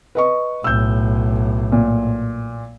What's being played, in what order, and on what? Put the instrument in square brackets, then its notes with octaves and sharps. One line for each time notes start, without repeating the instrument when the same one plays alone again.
[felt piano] B4 D#5 C#6
[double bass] B1 A2 [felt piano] E6 G6
[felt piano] A#2